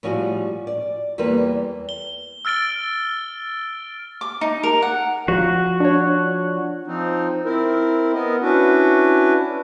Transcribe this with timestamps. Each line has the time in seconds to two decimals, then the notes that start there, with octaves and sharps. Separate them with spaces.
0.03 A2 F3 G3 C4 F#4 G#5
0.67 D5
1.18 E2 G3 A#3 G4 A4 B4
1.89 G7
2.45 E6 F6 A6 D7 G7
4.21 D6
4.41 D#4
4.63 A#4
4.82 F#5
5.28 F3 F#4
5.80 D4 C#5
6.87 F3 C4 D#4
7.45 C4 E4 A#4
8.14 B3 A#4 D#5
8.42 C#4 D4 E4 F#4 B4